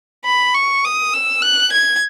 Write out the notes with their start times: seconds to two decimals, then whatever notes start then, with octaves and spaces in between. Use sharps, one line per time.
0.25 B5
0.54 C#6
0.84 D#6
1.13 E6
1.42 F#6
1.72 G#6